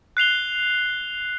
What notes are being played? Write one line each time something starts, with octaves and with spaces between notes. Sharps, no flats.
F#6 C7 F7 G7